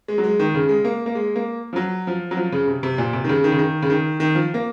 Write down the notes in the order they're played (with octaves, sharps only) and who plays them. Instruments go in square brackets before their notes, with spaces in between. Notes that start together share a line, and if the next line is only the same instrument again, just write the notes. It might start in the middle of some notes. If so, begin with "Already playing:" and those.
[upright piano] G#3
F#3
G#3
D#3
C#3
G#3
A#3
A#3
G#3
A#3
F3
F#3
F3
F#3
F3
C#3
C3
C3
A#2
C3
D#3
C#3
D#3
C#3
D#3
C#3
D#3
D#3
F3
A#3